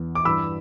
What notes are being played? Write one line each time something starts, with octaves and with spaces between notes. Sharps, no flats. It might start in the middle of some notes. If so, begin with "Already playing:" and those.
Already playing: E2 E3
D6
G2 E3 B5 E6